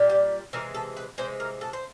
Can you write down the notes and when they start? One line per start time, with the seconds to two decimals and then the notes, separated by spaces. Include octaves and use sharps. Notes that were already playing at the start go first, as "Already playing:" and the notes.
Already playing: A#2 G3
0.10 G4
0.53 C3 E3 G#3 A#4
0.74 A4
0.97 B4
1.18 C3 E3 G#3 C5
1.40 A#4
1.61 A4
1.73 C5